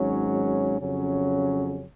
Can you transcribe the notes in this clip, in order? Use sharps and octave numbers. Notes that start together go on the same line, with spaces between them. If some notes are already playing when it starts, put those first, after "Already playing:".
Already playing: G#1 G#2 F#3 C#4
F2 C#3 F#3 C#4